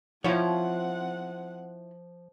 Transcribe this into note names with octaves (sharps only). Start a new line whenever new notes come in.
F3 C4 E4 F4 C#5 F#5